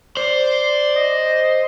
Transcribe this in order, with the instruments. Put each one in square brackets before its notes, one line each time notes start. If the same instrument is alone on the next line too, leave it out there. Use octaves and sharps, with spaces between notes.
[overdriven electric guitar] C5 [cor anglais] D5
[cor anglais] D#5